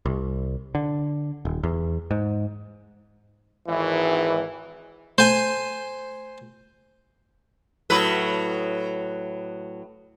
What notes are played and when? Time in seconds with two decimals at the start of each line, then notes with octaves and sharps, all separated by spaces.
0.06 C2
0.75 D3
1.45 D#1
1.63 E2
2.11 G#2
3.67 G#1 E3
5.18 A3 C5 G#5
7.90 A2 F#3 B4